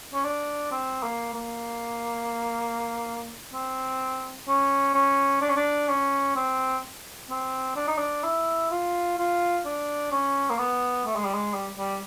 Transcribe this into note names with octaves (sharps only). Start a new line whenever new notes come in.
C#4
D4
C4
A#3
A#3
C4
C#4
C#4
D4
C#4
D4
C#4
C4
C4
D4
D#4
D4
E4
F4
F4
D4
C#4
A#3
B3
A3
G#3
G3
G#3
G3
G3